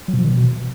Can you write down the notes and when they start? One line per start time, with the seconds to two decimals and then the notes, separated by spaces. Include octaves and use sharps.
0.08 F#3
0.14 B2
0.19 F3
0.24 D#3
0.30 B2